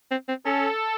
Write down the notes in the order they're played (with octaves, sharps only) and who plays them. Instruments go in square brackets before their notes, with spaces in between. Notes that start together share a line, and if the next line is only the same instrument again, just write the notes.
[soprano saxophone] C4
C4
[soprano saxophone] C#4 [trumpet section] A4